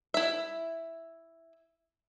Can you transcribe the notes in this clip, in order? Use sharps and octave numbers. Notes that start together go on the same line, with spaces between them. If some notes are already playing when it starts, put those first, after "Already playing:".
E4 E5